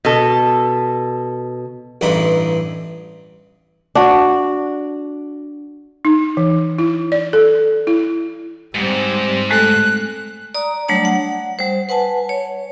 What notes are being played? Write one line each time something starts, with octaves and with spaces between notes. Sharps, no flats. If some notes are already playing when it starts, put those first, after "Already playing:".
B2 A4
A1 G2 E3 D#4 B5 C6
D4 F#4
D#4
E3
E4
D5
A4
E4
G#2 G3 C4
G#3 A3 A4 F#6
D5 A#5 D#6
F#3 G3 A3 D4 C#5 A5
F#5
G3 C5
B4 F#5 G#5 A5
C#5